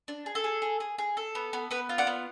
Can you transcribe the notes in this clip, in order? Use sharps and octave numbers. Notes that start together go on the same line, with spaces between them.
D4
G#4
A4
G#4
G#4
G#4
G#4
A4
B3
B3
B3 B4
F4
D5 F#5
B3